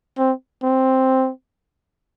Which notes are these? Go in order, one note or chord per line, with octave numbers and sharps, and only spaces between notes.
C4
C4